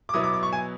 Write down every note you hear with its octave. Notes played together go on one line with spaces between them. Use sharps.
D6
B2 F#3 B3 E4 D#6
D6
D6
C#6
G#5